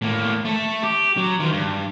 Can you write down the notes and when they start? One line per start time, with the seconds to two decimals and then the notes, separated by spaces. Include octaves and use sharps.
0.02 A2 A#3
0.45 A3 A4
0.83 G4
1.17 F#3
1.40 D#3 F4
1.52 G2